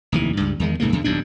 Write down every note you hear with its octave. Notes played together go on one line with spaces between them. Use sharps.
F1 D#2 E3
C#2 G2
E2 D#3 G#3
B1 G#2 C#3 A#3
E2 G2 D3
D#1 B1 G2 D4